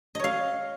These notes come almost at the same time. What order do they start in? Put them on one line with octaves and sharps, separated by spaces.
D#5 C#5 F5